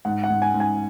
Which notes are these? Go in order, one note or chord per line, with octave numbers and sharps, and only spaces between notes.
G#2 F#5
F#5
G#2
G#5
G#2
G#5